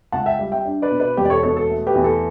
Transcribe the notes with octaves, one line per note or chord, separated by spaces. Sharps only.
C#2 F#5 A5
E5 G5
G3
E5 G5
D4
B4 D5
B2
B4 D5
E1 G4 B4
D5
A4 C#5
B2 A4 C#5
A4
A3
G4 B4
E2
A4